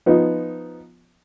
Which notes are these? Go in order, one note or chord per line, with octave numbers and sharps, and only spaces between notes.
F3 B3 D#4